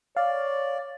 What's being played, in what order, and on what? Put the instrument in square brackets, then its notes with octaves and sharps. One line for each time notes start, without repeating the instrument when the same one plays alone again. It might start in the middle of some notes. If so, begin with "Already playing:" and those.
[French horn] C#5 [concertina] D5 [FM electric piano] F5